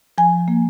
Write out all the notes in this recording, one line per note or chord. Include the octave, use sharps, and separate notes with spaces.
F3 G#5
A#3